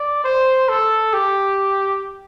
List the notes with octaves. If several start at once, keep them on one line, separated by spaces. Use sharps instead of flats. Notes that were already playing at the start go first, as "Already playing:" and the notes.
Already playing: D5
C5
A4
G4